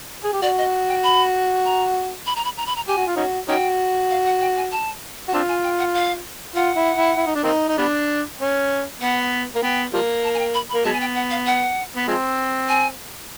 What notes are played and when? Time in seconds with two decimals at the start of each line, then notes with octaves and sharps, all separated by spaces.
0.24 G#4
0.33 G4
0.42 F#4 D5
0.58 D#5
0.89 G5
1.04 B5
1.65 A#5
2.26 B5
2.36 A#5
2.45 B5
2.57 A#5
2.66 B5
2.76 A#5
2.88 G4 G#5
2.97 F#4
3.07 F4
3.16 C#4 D#4 F#4
3.48 C#4 D#4 F#4 G5
4.10 F5
4.26 F#5
4.41 G5
4.57 G#5
4.72 A5
5.28 F#4
5.33 C4 D4 F4 A5
5.48 G#5
5.64 G5
5.79 F#5
5.94 F5
6.55 F4 F#5
6.76 E4
6.96 E4
7.17 E4
7.26 D#4
7.35 D4
7.44 A#3 C4 D#4
7.69 D#4
7.78 G3 B3 D4
8.40 C#4
9.01 B3 F#5
9.55 A#3
9.62 B3 G5
9.93 F3 G3 A#3
10.24 A5
10.34 G#5
10.39 G5
10.54 B5
10.69 B5
10.74 A#3
10.85 F#3 G#3 B3 A5
10.93 G#5
11.00 G5
11.15 F#5
11.30 F5
11.46 F#5
11.96 B3
12.07 F3 G#3 C4
12.68 G#5